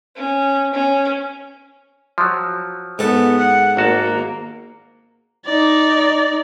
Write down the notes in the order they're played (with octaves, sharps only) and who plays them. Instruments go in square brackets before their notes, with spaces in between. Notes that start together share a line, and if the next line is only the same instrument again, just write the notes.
[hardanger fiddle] C#4
C#4
[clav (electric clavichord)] F3 F#3
[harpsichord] G#2 A4 [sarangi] B3
[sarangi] F#5
[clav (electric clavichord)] G#1 F#4 A5 [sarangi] A#3
[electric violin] D#4 D5